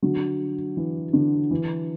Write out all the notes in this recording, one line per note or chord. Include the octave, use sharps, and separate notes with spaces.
D3 F#3
E3
D3
E3